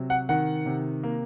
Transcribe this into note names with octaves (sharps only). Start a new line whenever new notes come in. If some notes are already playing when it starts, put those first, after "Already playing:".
Already playing: C3 F#3
F#5
D#3 F#5
C3
A#3